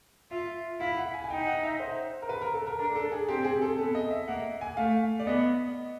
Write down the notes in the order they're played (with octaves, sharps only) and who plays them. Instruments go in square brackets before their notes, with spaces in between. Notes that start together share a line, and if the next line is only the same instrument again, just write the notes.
[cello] F4 [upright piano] E5
[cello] E4 [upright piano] F5
[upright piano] F#5
G#5
G#5
[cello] D#4 [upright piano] G5
[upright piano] F#5
E5
C5
A#4
B4
A#4
A4
A#4
[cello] D4 [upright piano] A#4
[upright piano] A4
G#4
[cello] C4 [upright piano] G4
[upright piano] G#4
A4
[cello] B3 [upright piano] A4
[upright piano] D#5
E5
[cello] A#3 [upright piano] F#5
[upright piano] G#5
[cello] A3 [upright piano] F5
[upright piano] D5
[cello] B3 [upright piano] D#5